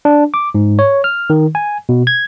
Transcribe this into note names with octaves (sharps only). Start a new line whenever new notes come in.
D4
D6
G#2
C#5
F6
D#3
G#5
B2
G#6